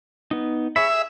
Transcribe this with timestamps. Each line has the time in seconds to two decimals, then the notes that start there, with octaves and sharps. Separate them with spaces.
0.31 B3 D#4
0.76 G#4 C#5 E5 B5
0.90 G#4